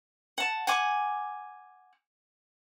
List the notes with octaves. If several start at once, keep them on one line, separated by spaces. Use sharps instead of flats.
F#5 A5
F#5 G#5 D6